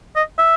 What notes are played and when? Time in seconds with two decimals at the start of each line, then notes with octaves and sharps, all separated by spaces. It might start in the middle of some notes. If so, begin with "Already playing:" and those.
0.16 D#5
0.38 E5